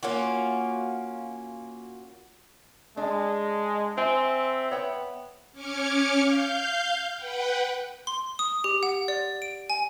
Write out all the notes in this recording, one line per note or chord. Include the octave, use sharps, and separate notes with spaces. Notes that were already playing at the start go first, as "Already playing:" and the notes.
A#3 C#4 F4 F#4
G#3 D4
C4 F4 E5 G#5
B3 C#5 G5
C#4 D6 F6 G#6 C#7
F5 G6
B4 F#5 G5
C6
D#6
G4
F#5
D5
D7
G#5